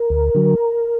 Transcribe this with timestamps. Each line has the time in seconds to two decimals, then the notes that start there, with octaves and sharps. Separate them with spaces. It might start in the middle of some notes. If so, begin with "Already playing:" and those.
Already playing: A#4
0.10 D2
0.35 D3 F#3